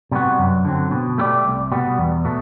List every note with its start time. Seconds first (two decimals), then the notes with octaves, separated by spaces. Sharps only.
0.12 C3 G3 B3 F#4
0.39 F#2
0.65 D3 F#3 C4
0.91 B2
1.18 A3 E4 G4 D5
1.45 C2
1.72 B2 G3 B3
1.98 E2
2.25 B2 A3